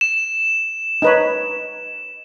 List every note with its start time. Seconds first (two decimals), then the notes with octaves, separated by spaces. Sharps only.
0.01 E7
1.02 D#4 B4 C#5